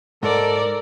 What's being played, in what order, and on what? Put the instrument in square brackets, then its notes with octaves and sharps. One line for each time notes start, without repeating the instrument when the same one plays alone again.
[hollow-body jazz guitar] G#2 [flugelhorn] A4 [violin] A#4 D5